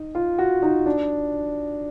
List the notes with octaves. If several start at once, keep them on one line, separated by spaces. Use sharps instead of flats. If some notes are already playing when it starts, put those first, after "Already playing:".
Already playing: D#4
F4
F#4
D#4
D4